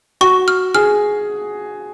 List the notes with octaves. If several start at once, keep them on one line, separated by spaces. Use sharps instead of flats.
F#4 C#6
F6
G#4 F6